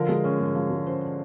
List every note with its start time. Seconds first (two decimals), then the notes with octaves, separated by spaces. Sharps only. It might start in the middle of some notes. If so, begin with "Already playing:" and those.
Already playing: D3 F3 A#4
0.09 G#3
0.24 C#4
0.40 G#2
0.55 F3
0.70 G#3
0.87 C#4 C5